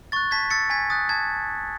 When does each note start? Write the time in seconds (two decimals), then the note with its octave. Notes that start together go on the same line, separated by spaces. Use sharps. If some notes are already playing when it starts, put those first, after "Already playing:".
0.12 C#6 F#6 A6
0.31 A5 G#6 B6
0.51 E6 A6 C#7
0.70 G#5 G#6 B6
0.90 D#6 F#6 A6
1.09 A5 G#6